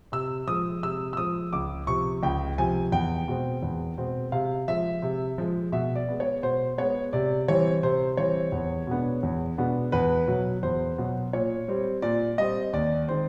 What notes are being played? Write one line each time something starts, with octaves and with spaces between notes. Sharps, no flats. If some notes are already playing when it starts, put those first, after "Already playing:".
C3 E6
F3 G#3 D#6
C3 E6
E6
F3 G#3 D#6
C#2 D6
C3 F3 C#6
C#2 G5
C3 F3 G#5
E2 G5
B2 G#3 C4
E2
B2 G#3 C4
C3 F5
F3 G#3 E5
C3
F3 G#3
B2 E5
D5
G#3 B3
C#5
B2 C5
G#3 B3 C#5
C3 D5
E3 G3 C4 C#5
C3 C5
E3 G3 C4 C#5
E2
B2 G#3 B3 D4
E2
B2 G#3 B3 D4
E2 B4
B2 F#3
E2 C5
B2 F#3
A#2 C#5
G3 C4
A#2 D5
G3 C4 D#5
D#2 D5
D#3 G#3 C4 C5